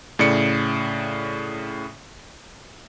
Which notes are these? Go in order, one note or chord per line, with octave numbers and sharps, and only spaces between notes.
A2 C#3 D5 C#7